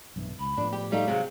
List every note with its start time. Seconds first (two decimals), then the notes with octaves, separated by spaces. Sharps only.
0.16 B1 G2 E3
0.39 C#2 B5
0.57 A2 F3 B3 D4
0.72 G4
0.92 G3 A3 D#4 F5
1.08 C3 F#3 G#4